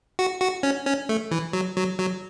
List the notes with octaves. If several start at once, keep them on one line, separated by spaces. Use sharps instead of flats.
F#4
F#4
C#4
C#4
A3
E3
F#3
F#3
F#3